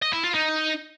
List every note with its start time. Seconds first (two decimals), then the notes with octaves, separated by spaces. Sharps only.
0.02 D#5
0.13 E4
0.24 F4
0.34 D#4